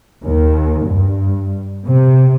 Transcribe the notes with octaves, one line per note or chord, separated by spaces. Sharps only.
D#2
G2
C3